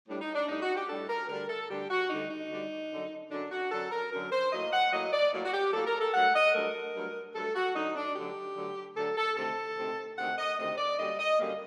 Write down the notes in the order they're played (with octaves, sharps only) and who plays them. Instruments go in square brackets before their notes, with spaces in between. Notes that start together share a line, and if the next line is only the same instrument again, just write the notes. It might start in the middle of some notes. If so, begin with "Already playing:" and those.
[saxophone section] A2 G3 D4
D#4
D4
A2 G3 D4 D#4
F#4
G4
A2 G3 D4 A4
A#4
D2 D3 G3 D4 A#4
A4
D2 D3 G3 D4 G4
F#4
D2 D3 G3 D4 D#4
D#4
D2 D3 G3 D4
F#2 D3 F#3
F#2 D3 F#3 D4
F#4
F#2 D3 F#3 A4
A#4
F#2 D3 F#3 A#4
C5
A2 F#3 A#3 D#5
F#5
A2 F#3 A#3 D#5
D5
A2 F#3 A#3
F#4
G4
A2 F#3 A#3 A4
A#4
A4
G2 F#3 A3 F#5
D#5
G2 F#3 A3 A#4
G2 F#3 A3
G2 F#3 A3 A4
F#4
D2 D3 F#3 D#4
D4
D2 D3 F#3 G4
D2 D3 F#3
D2 D3 F#3 A4
A4
D2 C3 D#3 A3 C4 A4
D2 C3 D#3 A3 C4
D2 C3 D#3 A3 C4 F#5
D#5
D2 C3 D#3 A3 C4 D#5
D5
F#2 D3 G3 A#3 D#5
D#5
F#2 D3 G3 A#3